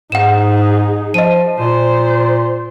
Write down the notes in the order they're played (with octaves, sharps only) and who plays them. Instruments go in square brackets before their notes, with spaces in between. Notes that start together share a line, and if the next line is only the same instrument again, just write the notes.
[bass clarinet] G#2 [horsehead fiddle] D#4 G#4 [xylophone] F#5 E7
[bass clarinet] F3 [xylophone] D#5 D#7
[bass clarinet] A#2 [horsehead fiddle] C5